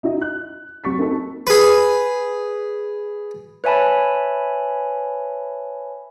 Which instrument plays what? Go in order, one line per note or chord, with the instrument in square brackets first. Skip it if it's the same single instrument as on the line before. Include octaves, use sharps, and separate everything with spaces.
[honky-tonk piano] D#4 E4 F#4 D#5
F#6
F#3 C4 G4 C#6 A6 B6
A#3 C4 D#4 A4
[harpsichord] G#4 B4
[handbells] B4 C#5 E5 G#5 A5 B5